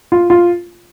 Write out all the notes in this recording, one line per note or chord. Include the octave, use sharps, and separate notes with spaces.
F4
F4